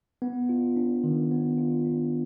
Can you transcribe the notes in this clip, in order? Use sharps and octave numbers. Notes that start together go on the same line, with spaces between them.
B3
F4
D4
D#3
B3
F4
D4